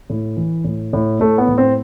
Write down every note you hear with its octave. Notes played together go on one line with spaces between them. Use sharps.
A2
E3
A2
A2
A2 A3
B3
A2
C4